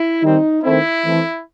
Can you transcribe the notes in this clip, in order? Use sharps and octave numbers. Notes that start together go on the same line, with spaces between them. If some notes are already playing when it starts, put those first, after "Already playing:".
Already playing: E4
D#3 G3 C4 D#4
D#3 A3 C4 E4
E3 A3 C4